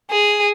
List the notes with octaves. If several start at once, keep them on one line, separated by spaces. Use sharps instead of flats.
G#4